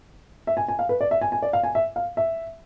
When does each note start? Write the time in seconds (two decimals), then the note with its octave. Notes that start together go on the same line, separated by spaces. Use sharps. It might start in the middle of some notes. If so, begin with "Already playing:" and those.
0.47 E5
0.57 G#5
0.68 G#5
0.79 F5
0.89 B4
1.01 D5
1.11 E5
1.22 G#5
1.32 G#5
1.42 D5
1.53 F5
1.64 G#5
1.75 E5
1.96 F5
2.17 E5